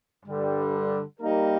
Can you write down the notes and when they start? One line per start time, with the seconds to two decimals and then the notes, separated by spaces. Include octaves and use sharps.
0.25 G2 D3 G3
1.19 G3 A#3 D#4 G4 A#4